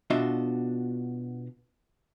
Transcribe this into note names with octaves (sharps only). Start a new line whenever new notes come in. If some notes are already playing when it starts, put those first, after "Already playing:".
B2 D4 F4 F#4 D#5 E5